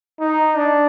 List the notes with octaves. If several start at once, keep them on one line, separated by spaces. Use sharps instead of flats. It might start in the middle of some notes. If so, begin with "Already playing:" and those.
D#4
D4